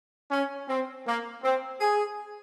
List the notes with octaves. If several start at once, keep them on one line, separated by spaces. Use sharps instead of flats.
C#4
C4
A#3
C4
G#4